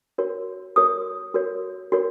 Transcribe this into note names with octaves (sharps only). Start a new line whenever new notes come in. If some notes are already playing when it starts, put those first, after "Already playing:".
F#4 A#4 C#5
F#4 A#4 C#5 D#6
F#4 A#4 C#5
F#4 A#4 C#5